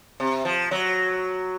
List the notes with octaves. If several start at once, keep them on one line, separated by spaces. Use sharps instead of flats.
C3
F3
F#3